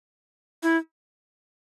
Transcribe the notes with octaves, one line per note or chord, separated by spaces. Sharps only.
E4